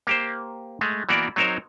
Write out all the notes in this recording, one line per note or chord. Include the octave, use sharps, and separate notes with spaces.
A#3 G4 C5
G#3 A3
E3 A#3 B3 F#4 A#4 D5
F#3 C4 D#4 A#4 C5 C#5